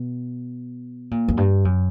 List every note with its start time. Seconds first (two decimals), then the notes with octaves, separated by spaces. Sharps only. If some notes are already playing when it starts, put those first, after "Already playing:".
Already playing: B2
1.11 A#2
1.28 F#2
1.37 G2
1.65 F#2